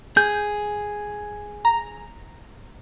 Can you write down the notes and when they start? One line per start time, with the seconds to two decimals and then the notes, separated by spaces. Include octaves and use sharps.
0.17 G#4 G6
1.65 A#5